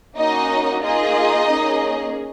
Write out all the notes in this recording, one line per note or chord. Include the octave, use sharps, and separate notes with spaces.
A#3 C#4 D#4 F#4 D#5
A#3 D#4 F4 G#4 D#5
A#3 C#4 G#4